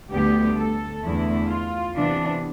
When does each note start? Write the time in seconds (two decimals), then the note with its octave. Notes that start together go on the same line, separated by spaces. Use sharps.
0.13 D2 D3 G3 B3 G4
0.59 A4
1.04 E2 D3 A3 E4
1.49 F4
1.95 C3 E3 B3 D4